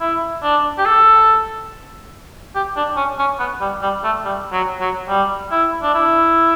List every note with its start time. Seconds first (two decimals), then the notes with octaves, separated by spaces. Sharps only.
0.01 E4
0.43 D4
0.78 G4
0.86 A4
2.55 G4
2.76 D4
2.97 C#4
3.19 C#4
3.39 B3
3.61 G3
3.82 G3
4.04 A3
4.25 G3
4.52 F#3
4.81 F#3
5.09 G3
5.51 E4
5.83 D4
5.94 E4